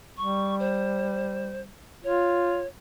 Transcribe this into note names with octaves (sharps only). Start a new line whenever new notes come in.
G3 C#6
C5
F4 C#5